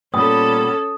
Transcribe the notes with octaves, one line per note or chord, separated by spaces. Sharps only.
A#2 G3 B3 C#4 A4 D#6